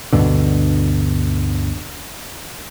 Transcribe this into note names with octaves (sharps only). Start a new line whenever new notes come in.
D2 G2 B2 D3